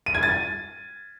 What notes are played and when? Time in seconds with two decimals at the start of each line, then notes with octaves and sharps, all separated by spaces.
0.06 D#7
0.15 G#6
0.23 A6